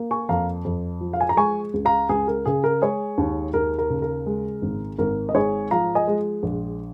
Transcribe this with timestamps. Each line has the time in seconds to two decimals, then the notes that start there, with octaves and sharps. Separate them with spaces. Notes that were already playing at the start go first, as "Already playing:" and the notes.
Already playing: A#3
0.11 G#5 C#6
0.29 F2 F5 A#5
0.65 F2
1.01 F3
1.13 F5
1.21 G#5
1.29 A#5
1.37 G#3 G#5 C#6
1.74 C#2
1.85 F5 A#5
2.09 C#2 G#4
2.28 A#4
2.46 C#3 G#4
2.64 A#4
2.82 G#3 G#4 C#5
3.18 D#2
3.54 D#2 A#4
3.78 A#4
3.90 C#3
4.02 A#4
4.26 G#3
4.62 G#1
4.99 G#1 A#4
5.29 D#5
5.34 G#2 G#4 C#5
5.71 F3 F5 A#5
5.95 D#5 G#5
6.07 G#3
6.43 A#1